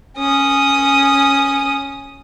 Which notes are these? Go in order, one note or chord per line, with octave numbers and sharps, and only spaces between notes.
C#4 D#6